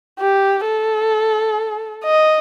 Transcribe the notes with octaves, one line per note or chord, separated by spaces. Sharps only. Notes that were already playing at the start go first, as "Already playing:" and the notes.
G4
A4
D#5